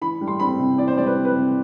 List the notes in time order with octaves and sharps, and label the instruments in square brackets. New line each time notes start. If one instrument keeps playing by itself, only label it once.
[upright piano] E3 B5
G3
C6
C4 B5
C3
E3 D5
C5
G3 D5
B4
C4
B4
C3